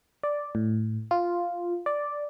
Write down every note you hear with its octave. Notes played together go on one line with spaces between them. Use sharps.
D5
A2
F4
D5